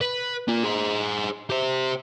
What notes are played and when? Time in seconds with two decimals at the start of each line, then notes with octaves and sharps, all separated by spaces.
0.01 B4
0.48 A#3 F4
0.64 G#4 C5
1.50 G4 C5